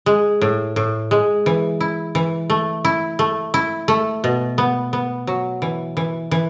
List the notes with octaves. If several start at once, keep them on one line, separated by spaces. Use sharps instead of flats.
G#3
A2
A2
G#3
E3
E4
E3
A3
E4
A3
E4
A3
B2
B3
B3
F#3
E3
E3
E3